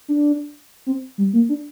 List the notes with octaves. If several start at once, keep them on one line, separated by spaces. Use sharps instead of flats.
D4
C4
G3
A#3
D4